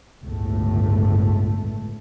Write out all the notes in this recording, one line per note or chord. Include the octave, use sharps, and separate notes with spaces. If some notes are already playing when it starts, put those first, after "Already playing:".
G1 C#2 A2 A3